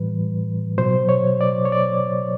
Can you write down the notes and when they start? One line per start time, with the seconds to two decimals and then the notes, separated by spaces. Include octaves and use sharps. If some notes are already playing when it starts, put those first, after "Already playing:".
Already playing: A2 E3 G3 B4
0.78 B2 F#3 C5
1.09 C#5
1.41 D5
1.65 C#5
1.72 D5